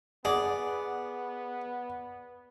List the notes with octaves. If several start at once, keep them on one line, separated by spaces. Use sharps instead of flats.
B3 G#4 D5 F#5